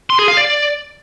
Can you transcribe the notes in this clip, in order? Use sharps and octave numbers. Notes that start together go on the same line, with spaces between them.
C6
G#4
F5
D5